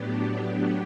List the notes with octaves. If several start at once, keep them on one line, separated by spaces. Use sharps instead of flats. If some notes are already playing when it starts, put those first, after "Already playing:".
Already playing: A2 F#3 B3 D4 G4